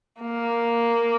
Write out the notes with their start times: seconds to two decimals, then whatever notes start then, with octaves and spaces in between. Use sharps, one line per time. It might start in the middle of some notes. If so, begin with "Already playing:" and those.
0.22 A#3